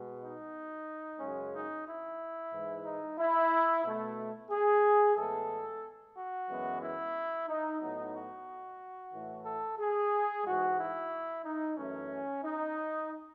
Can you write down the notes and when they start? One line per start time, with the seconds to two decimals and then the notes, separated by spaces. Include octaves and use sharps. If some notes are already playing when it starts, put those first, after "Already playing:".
Already playing: B2 G#3 B3
0.21 D#4
1.20 F#2 C#3 G#3 C#4
1.53 D#4
1.86 E4
2.53 G#2 E3 G#3
2.85 D#4
3.19 E4
3.84 B2 A3
4.50 G#4
5.17 A2 E3 G#3 B3 A4
6.15 F#4
6.48 F#2 E3 G#3 B3
6.81 E4
7.48 D#4
7.81 A2 F#3 B3 D#4
8.14 F#4
9.13 A2 E3 A3
9.46 A4
9.78 G#4
10.44 G#2 E3 G#3 F#4
10.77 E4
11.44 D#4
11.77 F#2 E3 A3 C#4
12.43 D#4